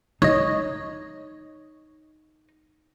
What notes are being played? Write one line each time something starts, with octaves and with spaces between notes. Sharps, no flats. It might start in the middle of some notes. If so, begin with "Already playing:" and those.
D#4 C#5 D#5